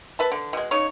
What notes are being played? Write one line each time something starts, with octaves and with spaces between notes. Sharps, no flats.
B4 E5 A5
D3
B2 G#3
C#3 D#4 C#5